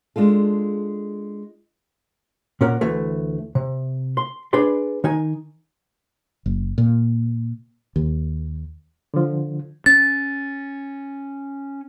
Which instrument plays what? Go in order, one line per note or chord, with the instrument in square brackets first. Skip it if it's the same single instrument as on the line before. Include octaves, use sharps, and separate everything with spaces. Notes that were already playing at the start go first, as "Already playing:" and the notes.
[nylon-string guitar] G#3 D4 F4 A4
[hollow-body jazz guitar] A#2 C#4 A#4 F#5
D2 E3 A3
C3
C6
D4 G#4 B4 D5 C6
D#3 D#4 G#5
[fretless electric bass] F#1
A#2
D#2
[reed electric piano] D3 F3
[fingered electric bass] C#4 [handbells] A6